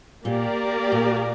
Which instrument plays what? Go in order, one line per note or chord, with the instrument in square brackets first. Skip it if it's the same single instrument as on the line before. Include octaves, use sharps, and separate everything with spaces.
[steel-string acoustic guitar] A#2 [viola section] A#3 G4 A#4 D5
[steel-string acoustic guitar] A#2